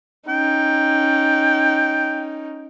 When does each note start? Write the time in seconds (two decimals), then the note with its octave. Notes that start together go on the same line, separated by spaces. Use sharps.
0.28 C#4 D#4 G5